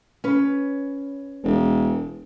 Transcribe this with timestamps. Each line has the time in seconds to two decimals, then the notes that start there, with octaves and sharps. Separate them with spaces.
0.24 C#4 B4
1.43 E1